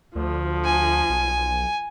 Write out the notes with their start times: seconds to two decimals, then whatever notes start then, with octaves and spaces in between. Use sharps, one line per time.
0.15 D2 F3
0.65 G#5
1.09 B1